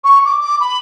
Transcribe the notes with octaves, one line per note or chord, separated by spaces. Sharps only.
C#6
D6
D6
B5